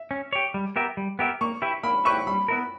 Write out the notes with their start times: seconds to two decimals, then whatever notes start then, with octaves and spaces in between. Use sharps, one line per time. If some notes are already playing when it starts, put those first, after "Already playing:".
Already playing: E5
0.11 C#4
0.33 G4 C#5
0.54 G3
0.76 B3 G4 A#4 E5
0.97 G3
1.19 B3 G4 A#4 E5
1.41 A#3 C#6
1.62 E4 G4 B4 E5
1.83 A#3 B5
2.05 E4 G4 B4 E5 C#6
2.27 G3 B5
2.48 B3 E4 A#4